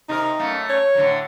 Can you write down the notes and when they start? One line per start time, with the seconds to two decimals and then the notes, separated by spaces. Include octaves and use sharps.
0.09 C3 D#4 A#4
0.39 F#2 A3 A#3
0.70 C#5
0.95 A2 D3 F#3